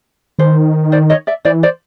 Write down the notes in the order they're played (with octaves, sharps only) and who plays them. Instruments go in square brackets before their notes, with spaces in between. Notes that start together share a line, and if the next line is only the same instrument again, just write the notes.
[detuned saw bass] D#3 [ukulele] C5
[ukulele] C5 D5
C#5 D#5
D5 E5
[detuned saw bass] E3 [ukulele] C5 D5
[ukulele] C5 D5